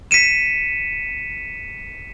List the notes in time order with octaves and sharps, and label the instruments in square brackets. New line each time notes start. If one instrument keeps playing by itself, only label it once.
[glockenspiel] B6 C#7 D#7 E7